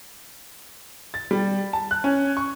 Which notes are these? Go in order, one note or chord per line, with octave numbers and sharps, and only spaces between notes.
A6
G3
A5
F#6
C#4
C#6